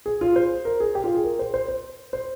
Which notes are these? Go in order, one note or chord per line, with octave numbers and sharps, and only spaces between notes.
G#4
F4
C5
A#4
G#4
G4
F4
G#4
A#4
C5
C5
C5
C5